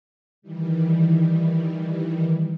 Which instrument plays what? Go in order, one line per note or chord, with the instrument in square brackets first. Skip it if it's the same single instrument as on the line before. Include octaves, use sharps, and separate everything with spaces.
[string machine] D#3 E3 G3